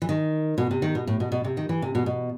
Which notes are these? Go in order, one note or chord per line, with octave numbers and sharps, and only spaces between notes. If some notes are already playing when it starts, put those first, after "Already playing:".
E3
D#3
B2
C3
D#3
B2
A2
B2
B2
C3
D#3
E3
C3
B2
B2